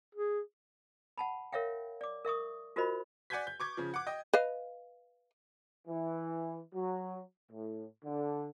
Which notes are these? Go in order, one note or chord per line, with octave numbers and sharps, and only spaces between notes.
G#4
F#5 A5 B5
A#4 C#5 E5 F5 G5
D5 D6
A#4 E5 C#6 D#6
F4 F#4 A#4 C5 D#5 B5
D5 F#5 G#5 G6 G#6 B6
G6
C#6 D6 G#6
C#3 F3
F#5 D6
D#5 G5
B4 D#5 F5
E3
F#3
A2
D3